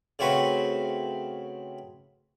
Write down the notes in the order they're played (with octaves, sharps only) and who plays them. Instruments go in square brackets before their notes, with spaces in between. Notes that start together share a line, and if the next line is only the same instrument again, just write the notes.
[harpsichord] C#3 A3 C4 F#4 B4